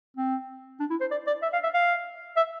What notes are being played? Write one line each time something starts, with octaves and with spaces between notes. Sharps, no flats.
C4
D4
E4
C5
D5
D5
E5
F5
E5
F5
E5